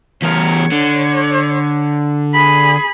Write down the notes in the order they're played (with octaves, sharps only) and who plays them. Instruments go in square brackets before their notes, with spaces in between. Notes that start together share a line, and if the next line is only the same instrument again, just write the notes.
[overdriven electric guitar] E2 A#4 [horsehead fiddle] C#5
[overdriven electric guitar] D3
[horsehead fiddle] G#4 B5